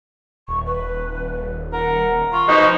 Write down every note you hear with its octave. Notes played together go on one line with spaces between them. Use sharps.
D#1 C#6
B4
A#4 F#5
F4 C#6
B2 F3 G#3 D#4